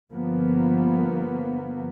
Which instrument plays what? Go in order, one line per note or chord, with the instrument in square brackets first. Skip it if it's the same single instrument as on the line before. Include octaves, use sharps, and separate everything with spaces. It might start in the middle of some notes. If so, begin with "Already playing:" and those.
[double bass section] G1 F3 A#3 B3